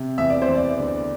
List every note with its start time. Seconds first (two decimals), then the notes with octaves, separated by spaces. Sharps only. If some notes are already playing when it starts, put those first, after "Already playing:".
Already playing: C3
0.18 E2 E5
0.30 D5
0.42 C5
0.48 E2
0.55 D5
0.77 D2